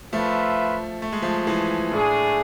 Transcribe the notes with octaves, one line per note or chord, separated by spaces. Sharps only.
F3 A3 F4 B4 E5
A3
G#3
F3 A3
E3 G#3
A2 A3 D4 G#4